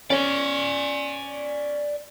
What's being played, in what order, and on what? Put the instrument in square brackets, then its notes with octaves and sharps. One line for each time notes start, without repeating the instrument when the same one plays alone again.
[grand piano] C#4 [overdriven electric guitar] D5 G#5